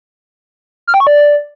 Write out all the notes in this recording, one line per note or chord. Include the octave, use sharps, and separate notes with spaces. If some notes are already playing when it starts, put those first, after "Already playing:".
F6
G5
C#6
D5